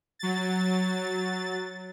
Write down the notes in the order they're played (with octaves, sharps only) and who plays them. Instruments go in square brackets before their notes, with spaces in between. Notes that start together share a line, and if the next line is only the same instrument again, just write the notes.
[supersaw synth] F#3 A6